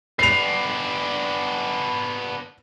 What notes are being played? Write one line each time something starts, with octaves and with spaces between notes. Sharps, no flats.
B3 D4 C7 F7